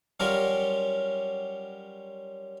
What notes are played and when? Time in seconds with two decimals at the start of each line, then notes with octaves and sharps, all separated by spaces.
0.20 F#3 G3 C#4 F4 A#4 C#5